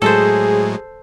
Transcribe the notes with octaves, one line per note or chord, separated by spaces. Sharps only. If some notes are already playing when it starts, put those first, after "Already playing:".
A2 F#3 G#3 G#4 A4 C5